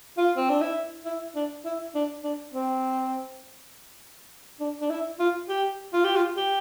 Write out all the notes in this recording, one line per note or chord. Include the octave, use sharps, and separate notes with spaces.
F4
C4
D4
E4
E4
D4
E4
D4
D4
C4
D4
D4
E4
F4
G4
F4
G4
F4
G4